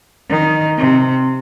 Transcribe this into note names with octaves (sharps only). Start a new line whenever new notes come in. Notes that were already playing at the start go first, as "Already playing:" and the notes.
D#3
C3